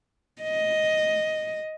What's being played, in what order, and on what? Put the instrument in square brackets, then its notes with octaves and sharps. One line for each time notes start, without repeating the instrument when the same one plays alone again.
[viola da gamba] D#5